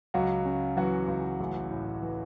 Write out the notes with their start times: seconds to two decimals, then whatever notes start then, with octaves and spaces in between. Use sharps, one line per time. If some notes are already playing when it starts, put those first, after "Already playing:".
0.14 C#2 F#3 F#4
0.46 C#3
0.77 E3 F#3 F#4
1.08 C#2
1.40 A1
1.71 A2
2.02 E3